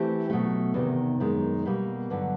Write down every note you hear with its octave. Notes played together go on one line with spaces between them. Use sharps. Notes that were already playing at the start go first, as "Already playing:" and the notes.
Already playing: E3 A3 C4 E4 G4
B2 F#3 A3
E2 C3 D#3
F#2 D#3 G#3
B2 G3 A#3
G2 D3 F#3